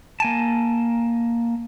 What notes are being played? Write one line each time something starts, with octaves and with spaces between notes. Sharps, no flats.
A#3 G#5 A5